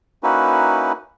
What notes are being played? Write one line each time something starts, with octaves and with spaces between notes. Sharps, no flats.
A#3 C#4 D#4 E4 F#4 B4